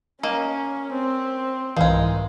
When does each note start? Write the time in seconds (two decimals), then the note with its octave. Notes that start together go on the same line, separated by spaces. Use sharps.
0.23 A#3 C#4 D#5
0.93 C4
1.76 C2 G#2 D#3 E3 G#3 F5